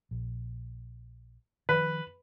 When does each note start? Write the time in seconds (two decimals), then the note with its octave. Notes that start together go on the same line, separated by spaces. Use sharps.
0.11 A#1
1.69 D#3 F3 B4